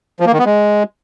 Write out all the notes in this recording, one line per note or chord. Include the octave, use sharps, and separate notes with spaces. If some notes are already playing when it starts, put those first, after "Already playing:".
F3
A#3
D#3
B3
G#3